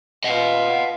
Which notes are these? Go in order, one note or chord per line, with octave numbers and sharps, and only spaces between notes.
B3 F4 D#5 F#5